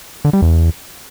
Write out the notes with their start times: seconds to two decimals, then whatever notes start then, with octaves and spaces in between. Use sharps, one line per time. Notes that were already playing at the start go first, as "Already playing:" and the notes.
0.25 D3
0.33 G3
0.42 E2